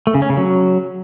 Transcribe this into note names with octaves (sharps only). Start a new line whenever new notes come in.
A3
C#3
C#4
C#3
F#3